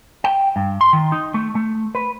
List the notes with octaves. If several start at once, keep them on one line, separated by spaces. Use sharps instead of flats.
G5
G2
C6
D#3
D#4
A3
A3
B4